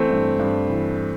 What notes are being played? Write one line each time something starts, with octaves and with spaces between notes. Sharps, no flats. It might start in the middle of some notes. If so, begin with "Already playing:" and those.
Already playing: E3 A3 C4
G2
G2
E3